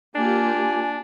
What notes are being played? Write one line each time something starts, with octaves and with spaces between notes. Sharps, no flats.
A#3 D4 F4 G4 G#5